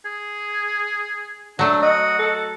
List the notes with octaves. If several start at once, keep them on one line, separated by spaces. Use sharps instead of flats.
G#4
F#3 A3 D4
F#4 D#5
A4